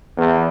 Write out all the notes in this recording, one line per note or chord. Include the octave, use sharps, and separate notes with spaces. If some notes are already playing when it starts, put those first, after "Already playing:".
E2